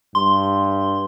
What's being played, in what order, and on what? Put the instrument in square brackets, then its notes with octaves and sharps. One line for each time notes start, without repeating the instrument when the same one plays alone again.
[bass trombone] G2 [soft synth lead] C6